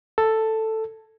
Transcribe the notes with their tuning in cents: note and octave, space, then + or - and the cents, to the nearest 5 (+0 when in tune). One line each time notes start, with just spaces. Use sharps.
A4 +5